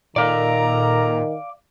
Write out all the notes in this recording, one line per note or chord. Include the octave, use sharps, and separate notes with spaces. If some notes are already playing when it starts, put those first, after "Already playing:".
A#2 D#3 A4 A#4 D5 F5 A#5